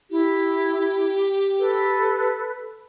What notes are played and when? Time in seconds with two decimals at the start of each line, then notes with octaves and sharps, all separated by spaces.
0.11 E4 G4
1.58 A4 B4